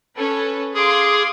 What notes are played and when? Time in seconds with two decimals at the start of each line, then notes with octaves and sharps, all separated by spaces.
0.16 C#4 A4 B4
0.74 G#4 F5 C6 D6